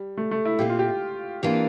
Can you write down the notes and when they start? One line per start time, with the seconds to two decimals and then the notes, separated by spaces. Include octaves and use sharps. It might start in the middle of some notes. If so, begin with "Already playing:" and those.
Already playing: G3
0.17 A3
0.31 A3
0.45 E4
0.59 A#2 A3 C4 G4
0.70 F4
0.79 G4
1.42 F2 E3 A#3 D4 F4 G4